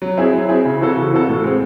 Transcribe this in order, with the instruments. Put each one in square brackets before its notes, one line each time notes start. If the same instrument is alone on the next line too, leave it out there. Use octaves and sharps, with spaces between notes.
[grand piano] F#3
C4 E4 G#4
F#3
C4 E4 G#4
C#3
E3 C4 F#4 A4
C#3
E3 C4 F#4 A4
A2
G#3 C4